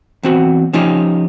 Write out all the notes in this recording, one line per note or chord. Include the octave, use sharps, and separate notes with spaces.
E2 C4 F#4
F3 C#4 D#4 F4 G4